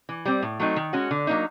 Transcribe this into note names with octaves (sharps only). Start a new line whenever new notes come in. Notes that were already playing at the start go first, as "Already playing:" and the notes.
E3
G3 C4
A2
F#3 A3 C4 D#4
D#3
G#3 C#4 F#4
D3
F#3 A#3 D#4